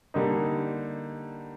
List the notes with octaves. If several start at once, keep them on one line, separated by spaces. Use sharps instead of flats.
D3 G3 A#3 D#4